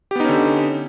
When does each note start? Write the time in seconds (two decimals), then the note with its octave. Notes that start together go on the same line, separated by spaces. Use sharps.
0.11 G4
0.15 B3
0.20 D#4
0.24 C#4
0.29 D3